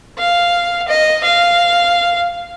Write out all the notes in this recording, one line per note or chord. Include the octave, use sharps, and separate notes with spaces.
F5
D#5
F5